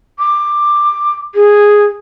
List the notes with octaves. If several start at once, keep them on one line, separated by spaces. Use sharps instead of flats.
D6
G#4